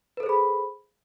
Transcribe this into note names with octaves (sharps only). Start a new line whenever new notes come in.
G#4 A4 B4 C5 B5